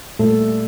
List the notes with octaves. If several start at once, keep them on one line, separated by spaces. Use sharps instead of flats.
A#2 G3 A3 A#3 A4